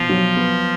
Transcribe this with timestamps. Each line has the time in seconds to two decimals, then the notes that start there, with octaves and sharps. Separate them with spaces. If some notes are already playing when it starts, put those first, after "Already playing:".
Already playing: B2 F3 F4
0.09 F#3
0.36 B3